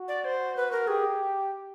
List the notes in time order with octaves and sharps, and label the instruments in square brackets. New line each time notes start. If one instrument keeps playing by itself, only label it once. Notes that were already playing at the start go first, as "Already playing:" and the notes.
Already playing: [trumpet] F#4
[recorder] D5
C5
B4
A#4
[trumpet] G4 [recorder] G#4